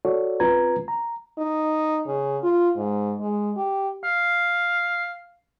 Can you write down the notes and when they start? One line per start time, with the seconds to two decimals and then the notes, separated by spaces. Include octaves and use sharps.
0.05 F#4 A4 C#5 D5
0.40 C4 C#4 F4 B4 A#5 G#6
0.88 A#5
1.38 D#4
2.07 C#3
2.43 F4
2.76 G#2
3.20 G#3
3.57 G4
4.03 F5